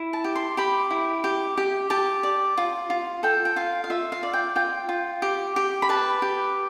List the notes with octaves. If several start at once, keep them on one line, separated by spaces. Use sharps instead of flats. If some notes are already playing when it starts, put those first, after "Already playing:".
Already playing: E4
A5
G4
C6
G4 B5
E4
G4
G4
G4 A5
D5
F4
F4
A4 G5
G5
F4 F5
F5
F4 E5
F5
D5
G5
F4 G5
F4
G4
G4
B5
B4 A5
G4